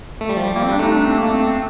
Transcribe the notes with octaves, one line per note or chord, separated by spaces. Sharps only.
A3
G3
F3
G3
G3 A#3
C4
G3
D4
A3 D#4
D4
C4
A#3
C4
C4